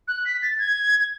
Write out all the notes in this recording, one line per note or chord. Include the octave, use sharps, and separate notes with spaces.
F#6
B6
A6
G#6